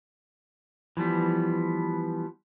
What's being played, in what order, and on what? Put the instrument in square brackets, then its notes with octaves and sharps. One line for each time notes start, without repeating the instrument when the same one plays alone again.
[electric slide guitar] E3 F3 G3 B3